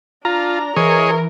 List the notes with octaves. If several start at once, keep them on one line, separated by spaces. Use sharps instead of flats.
D4 F4 A#5
E3 G#4 A#4 C#5 D#5